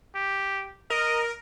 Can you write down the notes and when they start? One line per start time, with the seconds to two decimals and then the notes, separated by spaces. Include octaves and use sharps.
0.15 G4
0.90 A#4 D#5